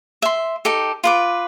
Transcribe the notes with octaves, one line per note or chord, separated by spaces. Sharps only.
E5 C6
D#4 G4 A4
F4 B4 D6